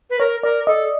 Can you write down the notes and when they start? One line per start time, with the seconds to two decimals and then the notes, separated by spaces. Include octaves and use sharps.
0.10 B4
0.19 A#4 C#5
0.43 A#4 D5
0.67 A4 D#5